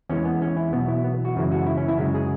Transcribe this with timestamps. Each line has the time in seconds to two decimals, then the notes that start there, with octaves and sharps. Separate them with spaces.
0.09 E2 E3 G#3 C#4
0.25 B3
0.42 C#4
0.57 E4
0.72 E2 B2 F#3 B3
0.88 E4
1.04 B3
1.25 F#4
1.36 F#2 C#3 E3 G#3
1.52 F#4
1.66 E4
1.77 C#4
1.88 E4
1.98 F#2 C#3 G#3
2.14 G#4